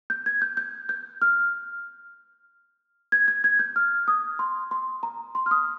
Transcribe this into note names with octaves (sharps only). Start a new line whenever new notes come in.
G6
G#6
G6
G6
G6
F6
G#6
G#6
G#6
G6
F6
D#6
C6
C6
A#5
C6
F6
D#6